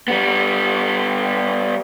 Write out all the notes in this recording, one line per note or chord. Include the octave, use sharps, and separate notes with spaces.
G3 B3